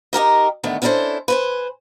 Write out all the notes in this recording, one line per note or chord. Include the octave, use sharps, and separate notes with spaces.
D#4 G4 A#4 D#5
D3 D#3 A3 B3
B3 C#4 D4 E4 A4 C5
B4 C5 G#5